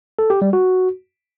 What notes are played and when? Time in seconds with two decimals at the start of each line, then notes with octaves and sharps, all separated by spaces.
0.19 A4
0.30 G4
0.42 G3
0.53 F#4